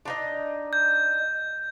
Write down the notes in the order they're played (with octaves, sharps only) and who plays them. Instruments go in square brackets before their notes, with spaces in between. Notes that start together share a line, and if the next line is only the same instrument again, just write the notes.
[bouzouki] D4 D#4 D#5
[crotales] G6